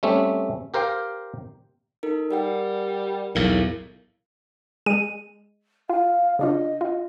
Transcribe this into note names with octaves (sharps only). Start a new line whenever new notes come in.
G3 A3 C4 C#4
G4 A#4 C5 F5 G5
D#4 A4 A#4
G3 A#4 F#5 G5
B1 E2 A2 E4 A#4 F5
G#3 D#7
F4 F5
C#3 D4 F4 D#5
F4